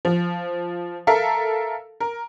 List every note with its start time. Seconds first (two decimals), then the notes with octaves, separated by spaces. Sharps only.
0.05 F3
1.07 A4 A#4 E5 F5
2.00 A#4